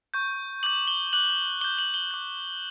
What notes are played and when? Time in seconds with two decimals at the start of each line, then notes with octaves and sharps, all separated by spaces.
0.14 C#6 G6
0.63 D6 G6 F#7
0.87 G7
1.13 D6 F#6 F#7
1.61 D6 G7
1.64 G6
1.79 F#7
1.94 G7
2.11 D6 G6